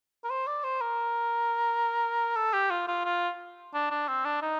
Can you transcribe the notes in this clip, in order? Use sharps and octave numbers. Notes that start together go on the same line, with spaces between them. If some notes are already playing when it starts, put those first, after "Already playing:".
A#4
C5
D5
C5
A#4
A4
G4
F4
F4
F4
D4
D4
C4
D4
D#4